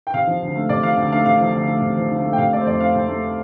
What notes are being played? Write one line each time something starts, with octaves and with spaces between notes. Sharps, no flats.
G5
C3 F5
F3
D2
A3
C3 D5
F3 F5
D2
A3 F5
C3 F5
F3
D2
A3
C3
F3
D2
A3
G5
C3 F5
A3 D5
C5
F2 D5
C4 F5
C3 C5
A3